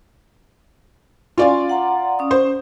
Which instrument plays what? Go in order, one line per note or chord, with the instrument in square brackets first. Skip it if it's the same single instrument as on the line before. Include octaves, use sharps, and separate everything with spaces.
[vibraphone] C#4 G#5 C6 [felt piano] F4 D5 F5
[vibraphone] F#5 A#5 C6
C#4 D#6
[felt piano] C5